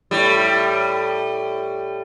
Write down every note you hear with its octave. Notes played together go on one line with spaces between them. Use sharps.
A2 G3